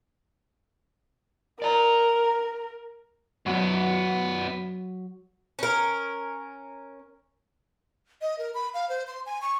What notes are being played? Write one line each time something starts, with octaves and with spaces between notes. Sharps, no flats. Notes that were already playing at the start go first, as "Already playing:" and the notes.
A#4 D5 A#5
F#2 F#3 B3
C#4 A#4
D#5
A#4
B5
F5
C5
C6
G#5
C#6